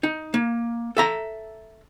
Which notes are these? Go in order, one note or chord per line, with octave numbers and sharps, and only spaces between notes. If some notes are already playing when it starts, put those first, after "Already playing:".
D#4
A#3
A4 E5 A#5